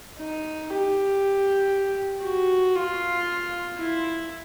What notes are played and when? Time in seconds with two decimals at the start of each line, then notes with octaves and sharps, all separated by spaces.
0.19 D#4
0.70 G4
2.24 F#4
2.75 F4
3.78 E4